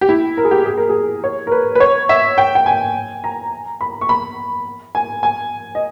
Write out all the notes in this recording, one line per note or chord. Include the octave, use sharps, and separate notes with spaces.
G4
E4
A#4
G#4
G4
G#4
A#4
G#4
C#5
A#4
B4
B4
C#5
E5
G5
G5
G#5
A#5
B5
C#6
B5
G#5
G#5
D#5